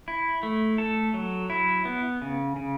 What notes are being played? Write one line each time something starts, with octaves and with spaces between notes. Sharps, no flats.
E4
A3
A4
F#3
E4
B3
C#3
C#3